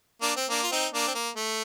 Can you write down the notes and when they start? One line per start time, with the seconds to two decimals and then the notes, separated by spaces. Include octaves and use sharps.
0.22 A#3 D4
0.36 C4
0.50 A#3 D4
0.63 F4
0.71 C4 D#4
0.93 A#3 D4
1.08 C4
1.15 A#3
1.36 A3